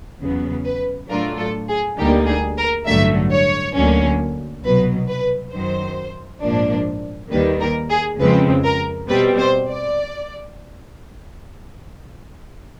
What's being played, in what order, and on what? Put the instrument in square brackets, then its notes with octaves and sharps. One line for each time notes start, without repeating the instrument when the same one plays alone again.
[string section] E2 C#3 F#3 B3
B4
A2 F#3 A3 D4 F4 A#4
A4
G#4
D2 D3 G3 A#3 D#4 G4
G#4
A#4
A1 G2 D3 F#3 A3 E5
C#5
D2 D3 F#3 A#3 C#4
C2 B2 F#3 B4
B4
F#2 D#3 F#3 C5
A#1 G#2 F3 A#3 D4
D#2 D#3 G3 A#3 B4
A#4
G#4
F2 C#3 F3 G#3 C4 B4
A#4
B2 G3 C4 B4
C5
D5